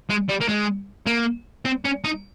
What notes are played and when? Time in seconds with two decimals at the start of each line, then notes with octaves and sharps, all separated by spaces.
0.09 G#3
0.28 G3
0.40 A#3
0.48 G#3
1.07 A#3
1.65 C4
1.85 C#4
2.04 D#4